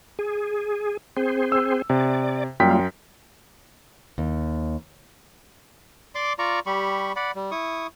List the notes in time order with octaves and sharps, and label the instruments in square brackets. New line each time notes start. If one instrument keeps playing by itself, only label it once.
[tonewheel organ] G#4
C4 G#4 C5
[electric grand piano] E6
[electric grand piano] C3 [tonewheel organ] D5
[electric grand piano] F#2 G5 B6 [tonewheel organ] G3 A#3 F4
[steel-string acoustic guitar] D#2
[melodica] D5 C6 D6
F4 D5 A#5 C#6
G3 G4 B5 C#6
D5 F#5 B5
G3
E4 C#6 D#6